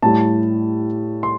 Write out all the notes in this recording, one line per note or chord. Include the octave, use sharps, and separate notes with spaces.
A2 G3 A5
C6